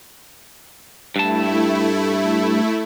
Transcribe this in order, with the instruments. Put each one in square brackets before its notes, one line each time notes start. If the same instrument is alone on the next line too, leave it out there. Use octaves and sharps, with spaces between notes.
[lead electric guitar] G2 A5 [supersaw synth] A3 E4